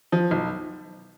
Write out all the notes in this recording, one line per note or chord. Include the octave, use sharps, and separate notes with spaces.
F3
B1